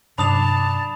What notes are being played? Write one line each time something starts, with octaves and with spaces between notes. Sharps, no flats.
G2 C3 F#3 D4 A5 B5 D#6 F7